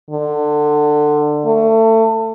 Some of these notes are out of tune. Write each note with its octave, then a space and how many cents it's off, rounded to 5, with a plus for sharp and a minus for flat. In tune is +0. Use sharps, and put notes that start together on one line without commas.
D3 +20
A3 +25